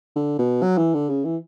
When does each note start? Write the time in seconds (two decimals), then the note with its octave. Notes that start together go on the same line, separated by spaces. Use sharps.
0.16 D3
0.39 B2
0.63 F#3
0.78 E3
0.94 D3
1.09 C#3
1.25 E3